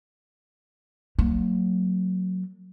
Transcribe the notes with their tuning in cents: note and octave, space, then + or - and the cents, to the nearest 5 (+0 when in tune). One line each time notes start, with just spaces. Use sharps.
F#3 +0 A#3 -35